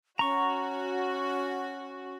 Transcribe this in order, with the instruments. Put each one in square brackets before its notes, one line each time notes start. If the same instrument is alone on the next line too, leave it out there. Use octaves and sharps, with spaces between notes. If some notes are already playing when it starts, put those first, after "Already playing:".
[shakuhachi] C#4 [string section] F#4 [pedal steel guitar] A#5 C#6